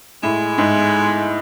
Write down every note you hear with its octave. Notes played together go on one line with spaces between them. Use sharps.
A2 G#3
G#2